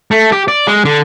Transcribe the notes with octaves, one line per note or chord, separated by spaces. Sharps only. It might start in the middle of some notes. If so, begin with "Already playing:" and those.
A3
G4
D5
G#3
D3